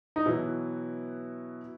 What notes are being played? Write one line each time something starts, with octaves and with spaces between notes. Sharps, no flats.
D#4
B2 E3 F#3 E4